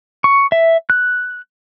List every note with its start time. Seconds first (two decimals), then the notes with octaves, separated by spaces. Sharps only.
0.24 C#6
0.52 E5
0.90 F#6